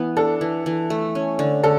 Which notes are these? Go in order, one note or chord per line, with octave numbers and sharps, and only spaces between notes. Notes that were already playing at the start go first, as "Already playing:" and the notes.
Already playing: E3 B3
D4 A4
E3
E3
A3
C#4
D3
D3 A4